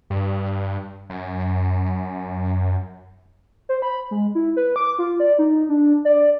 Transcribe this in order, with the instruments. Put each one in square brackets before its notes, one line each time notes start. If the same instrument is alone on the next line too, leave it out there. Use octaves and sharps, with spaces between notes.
[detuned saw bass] G2
F#2
[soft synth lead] C5
B5
G#3
E4
B4
D6
F4
D5
D#4
D4
D5